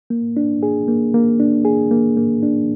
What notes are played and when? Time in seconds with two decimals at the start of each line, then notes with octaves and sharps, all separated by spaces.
0.10 A#3
0.37 D4
0.63 G#4
0.88 A#3
1.14 A#3
1.40 D4
1.65 G#4
1.91 A#3
2.17 A#3
2.43 D4